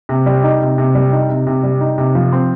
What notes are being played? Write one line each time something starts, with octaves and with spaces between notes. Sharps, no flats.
C3
G3
D#4
C3
C3
G3
D#4
C3
C3
G3
D#4
C3
F3
C4